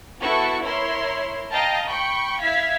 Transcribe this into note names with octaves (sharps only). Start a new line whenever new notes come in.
B3 E4 F#4 A4 C#6
E4 A#4 C#5 C6
D#5 F5 G5 A5 A#5
G5 B5 C#6
E4 E5 F5 G#6 B6